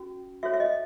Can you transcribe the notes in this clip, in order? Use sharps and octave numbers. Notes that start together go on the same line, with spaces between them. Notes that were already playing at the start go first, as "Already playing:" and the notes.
Already playing: C#4 F#4
F#4 A4 C#5 E5
E5
D#5